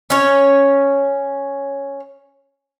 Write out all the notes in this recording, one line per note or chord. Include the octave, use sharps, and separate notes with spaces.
C#4 C#5